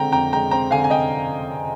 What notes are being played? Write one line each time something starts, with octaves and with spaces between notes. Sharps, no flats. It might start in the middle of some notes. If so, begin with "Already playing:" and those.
Already playing: D3 G#3 C4 G5 A#5
F2 G5 A#5
G#3 G5 A#5
C4 G5 A#5
D3 F5 G#5
G#5
D#5 G5